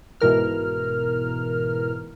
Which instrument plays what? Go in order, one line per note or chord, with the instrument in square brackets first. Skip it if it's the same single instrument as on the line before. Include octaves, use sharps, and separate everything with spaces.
[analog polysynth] G#2 B2 E3 A#4 F6